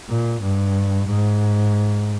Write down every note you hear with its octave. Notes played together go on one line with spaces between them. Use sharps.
A#2
G2
G#2